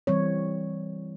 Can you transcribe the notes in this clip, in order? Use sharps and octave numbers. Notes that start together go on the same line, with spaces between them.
E3 G3 C4 C#5